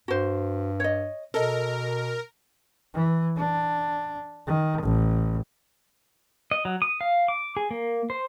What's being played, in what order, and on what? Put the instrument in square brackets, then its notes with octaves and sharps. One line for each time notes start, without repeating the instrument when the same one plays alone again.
[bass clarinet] G2 [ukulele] F#4 C5
[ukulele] C#5 D#5
[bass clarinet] B2 [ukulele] A4 D#5 [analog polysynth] A#4
[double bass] E3
D4
D#3
A1
[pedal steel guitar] D#5
F#3
D#6
F5
D6
G#4
A#3
C5